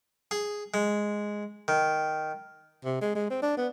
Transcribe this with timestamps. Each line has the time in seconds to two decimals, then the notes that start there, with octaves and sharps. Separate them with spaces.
0.31 G#4
0.74 G#3
1.68 D#3
2.85 C3
3.01 G#3
3.15 G#3
3.30 C4
3.42 D4
3.57 B3